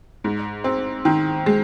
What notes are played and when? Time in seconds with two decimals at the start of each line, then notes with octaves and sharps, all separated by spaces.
0.24 G#2
0.64 C4
1.05 D#3
1.46 G#3